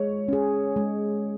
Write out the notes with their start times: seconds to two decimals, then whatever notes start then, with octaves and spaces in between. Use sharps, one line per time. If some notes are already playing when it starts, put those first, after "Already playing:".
Already playing: G#3 C#5
0.28 C#4 G#4
0.76 G#3